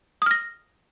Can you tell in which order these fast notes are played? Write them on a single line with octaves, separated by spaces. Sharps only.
D#6 F6 A#6